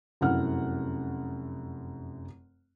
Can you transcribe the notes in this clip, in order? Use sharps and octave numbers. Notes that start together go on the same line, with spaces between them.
F1 F#2 E4 F#5 F6